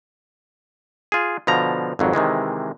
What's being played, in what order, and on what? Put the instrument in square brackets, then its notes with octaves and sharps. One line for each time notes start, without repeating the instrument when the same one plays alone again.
[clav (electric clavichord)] F4 G#4
B2 D3 F3 A#5
G#1 F2 F#3
C3 D#3 E3 G#3